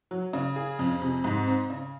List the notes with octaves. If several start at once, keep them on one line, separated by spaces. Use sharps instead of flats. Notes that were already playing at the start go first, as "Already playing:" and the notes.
F#3
C#3
G#4
F2
C3
G#2
C4
C#3